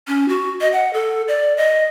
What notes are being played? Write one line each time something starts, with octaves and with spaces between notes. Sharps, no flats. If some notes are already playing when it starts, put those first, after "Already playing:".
C#4
F#4
D#5
F#5
A4
D5
D#5